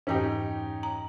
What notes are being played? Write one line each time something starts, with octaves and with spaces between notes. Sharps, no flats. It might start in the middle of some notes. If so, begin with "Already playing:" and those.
F2 G#2 E3 C#4 D#4 G4
A#5